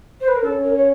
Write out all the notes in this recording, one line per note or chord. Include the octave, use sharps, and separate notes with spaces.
C5
B4
A#4
C#4 A4
A#4
C#5